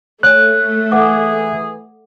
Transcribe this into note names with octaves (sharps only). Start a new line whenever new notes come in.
A3 C#5 G#5 F#6
E3 G#4 E5 F#5 D6